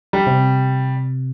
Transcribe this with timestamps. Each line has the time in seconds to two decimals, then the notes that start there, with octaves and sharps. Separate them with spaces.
0.13 G3
0.27 C3